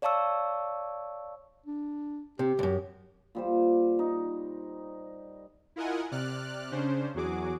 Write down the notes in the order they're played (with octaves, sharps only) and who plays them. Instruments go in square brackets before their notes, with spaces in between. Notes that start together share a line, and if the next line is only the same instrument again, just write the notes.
[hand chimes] C#5 D5 F5 A5 C#6 E6
[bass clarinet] D4
[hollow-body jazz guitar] C3 [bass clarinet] G4
[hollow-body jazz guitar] C2 F#2
[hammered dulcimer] A#2 G3 C5
D#4
[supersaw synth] E4 F4 A#4 D#5 F#5 G#5
C3 D5 F6 F#6
C#3 C#4 D4 C5
E2 F#3 F#4 G#4 D6